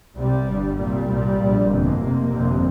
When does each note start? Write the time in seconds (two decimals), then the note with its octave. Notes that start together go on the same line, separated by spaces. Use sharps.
0.16 C2 C3 G3
0.47 G1 G2
0.77 C2 A#2 G3
1.08 C2 A#2
1.38 A#1 A#2
1.68 G1 F2 C3 A#3
1.98 F1 F2 C3
2.28 G1 F2 C3